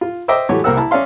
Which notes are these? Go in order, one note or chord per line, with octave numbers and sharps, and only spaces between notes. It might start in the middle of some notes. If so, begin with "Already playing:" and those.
F4
C5 D#5 E5 G5 D6 E6
E3 G#3 A3 F#4 G4 C#5
C2 A#3 A#4 C5 F#5 E6
E4 A5 A#5
C#4 D5 E5 F5 C6